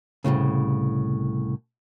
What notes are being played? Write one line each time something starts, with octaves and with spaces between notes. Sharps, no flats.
C2 F2 A2 C#3